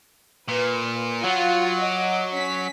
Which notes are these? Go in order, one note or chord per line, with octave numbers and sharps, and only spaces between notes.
A#2 B4
F#3 F4 F#5
D#5 F#5 D6
C#4 B6